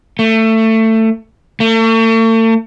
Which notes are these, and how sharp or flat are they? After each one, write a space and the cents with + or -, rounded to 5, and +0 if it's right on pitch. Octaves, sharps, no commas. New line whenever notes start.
A3 +20
A3 +40